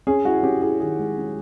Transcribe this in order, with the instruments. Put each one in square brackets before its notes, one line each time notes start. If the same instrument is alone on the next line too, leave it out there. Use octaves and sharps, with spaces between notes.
[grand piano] C#4 G#4
E4 F#4
C#4 G4
E4 G#4
D#3 G#4
G#3
C#4